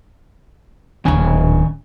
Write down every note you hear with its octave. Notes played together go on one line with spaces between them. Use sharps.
D1 A#1 D#3 C#4 G#5